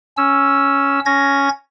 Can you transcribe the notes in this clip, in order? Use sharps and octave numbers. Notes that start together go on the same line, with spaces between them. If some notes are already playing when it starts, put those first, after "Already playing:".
C#4 E6
C#4 G#6 A#6